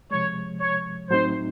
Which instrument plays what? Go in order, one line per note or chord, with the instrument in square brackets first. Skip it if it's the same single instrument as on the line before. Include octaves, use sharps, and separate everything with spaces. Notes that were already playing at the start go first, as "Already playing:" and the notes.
[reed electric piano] C3 F3 G#3 [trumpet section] C#5
[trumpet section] C#5
[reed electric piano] A2 F#3 A3 C4 D#4 [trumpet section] C5